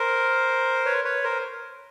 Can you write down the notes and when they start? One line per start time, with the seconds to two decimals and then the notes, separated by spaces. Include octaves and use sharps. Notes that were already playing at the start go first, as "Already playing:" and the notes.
Already playing: A#4 C5
0.86 B4 C#5
1.04 B4 C#5
1.23 A#4 C5